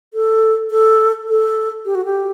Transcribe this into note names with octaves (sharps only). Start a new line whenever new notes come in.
A4
A4
A4
G4
F#4
G4